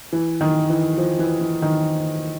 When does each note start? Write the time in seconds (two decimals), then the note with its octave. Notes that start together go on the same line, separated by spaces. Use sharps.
0.13 E3
0.41 D#3
0.70 E3
0.97 F3
1.19 E3
1.41 E3
1.62 D#3